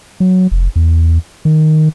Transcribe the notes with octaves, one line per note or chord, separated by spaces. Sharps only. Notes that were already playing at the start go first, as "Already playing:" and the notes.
F#3
F1
E2
D#3